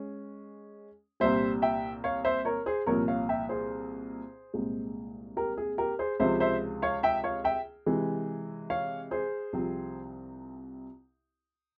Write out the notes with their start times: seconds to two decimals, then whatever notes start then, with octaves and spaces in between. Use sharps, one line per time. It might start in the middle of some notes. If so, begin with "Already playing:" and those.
Already playing: G#3 C#4
1.20 C2 A#2 G3 C5 E5
1.62 E5 G5
2.04 C#5 F5
2.25 C5 E5
2.45 A#4 C#5
2.66 G#4 C5
2.86 C2 A#2 F3 A#4 C#5
3.08 C#5 F5
3.29 E5 G5
3.49 G#4 C5
4.54 C2 A#2 G#3
5.37 G4 A#4
5.57 G#4
5.78 G4 A#4
5.99 G#4 C5
6.20 C#2 C3 F3 C5 E5
6.40 C5 E5
6.82 C#5 F5
7.03 E5 G5
7.24 C#5 F5
7.44 E5 G5
7.86 C3 E3 G#3
8.70 C#5 F5
9.11 G#4 C5
9.53 C2 C3 F3 C4